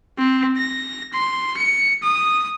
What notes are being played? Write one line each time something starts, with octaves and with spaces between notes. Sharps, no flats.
C4
A#6
C6
C#7
D#6